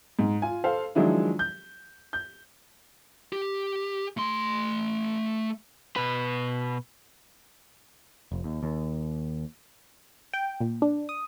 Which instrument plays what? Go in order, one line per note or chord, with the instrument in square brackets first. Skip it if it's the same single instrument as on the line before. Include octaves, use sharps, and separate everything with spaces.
[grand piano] G#2
F4 G#5
A4 C5 F5
D#3 F3 F#3 G#3 D4 E4
G6
G6
[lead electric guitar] G4
A3 C6
[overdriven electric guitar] B2 B4
[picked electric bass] F1
D#2
D#2
[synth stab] G5
A#2
D4
D#6